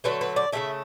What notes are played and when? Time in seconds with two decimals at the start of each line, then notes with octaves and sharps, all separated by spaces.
0.04 D3 F#3 A3 B4
0.21 B4
0.36 D5
0.52 C#3 F#3 A3 E5